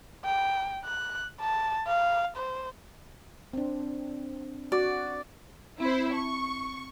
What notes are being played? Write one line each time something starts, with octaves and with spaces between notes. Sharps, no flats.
G5
F#6
A5
F5
C5
C4 D4
F#4 D5
C4 E4 C5
A5 C#6